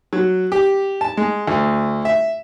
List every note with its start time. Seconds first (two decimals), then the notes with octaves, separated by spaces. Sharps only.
0.13 F#3
0.52 G4
1.01 A5
1.17 G#3
1.47 D2
2.05 E5